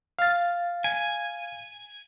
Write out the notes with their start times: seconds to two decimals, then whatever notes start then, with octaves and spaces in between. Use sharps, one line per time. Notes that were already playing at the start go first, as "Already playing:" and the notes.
0.19 F5 A6
0.84 G#5